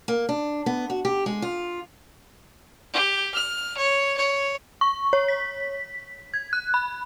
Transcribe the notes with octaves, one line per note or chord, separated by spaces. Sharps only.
A#3
D4
B3
F#4
G4
G#3
F4
G4
F6
C#5
C#5
C#6
C#5
B6
G#6
F#6
B5